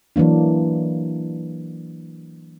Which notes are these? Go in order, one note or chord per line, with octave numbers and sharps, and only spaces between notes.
E3 F#3 A#3 D4